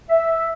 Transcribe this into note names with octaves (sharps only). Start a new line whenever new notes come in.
E5